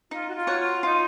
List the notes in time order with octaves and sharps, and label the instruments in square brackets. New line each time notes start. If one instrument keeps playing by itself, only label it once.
[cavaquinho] D#4 [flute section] F4
[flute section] F#4
F4
[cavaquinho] F#4 C#5 F#5
[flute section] F4
[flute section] D#4 [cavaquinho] F4